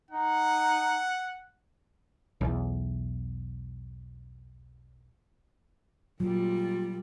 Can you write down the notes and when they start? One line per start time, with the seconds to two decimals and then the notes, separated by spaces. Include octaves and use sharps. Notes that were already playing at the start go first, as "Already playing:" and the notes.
0.11 D#4 F#5
2.41 B1 E2
6.20 A#2 F#3 G3 F4